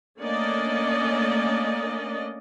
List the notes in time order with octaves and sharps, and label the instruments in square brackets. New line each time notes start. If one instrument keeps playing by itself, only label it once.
[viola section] A3 A#3 C#4 D4 D5 D#5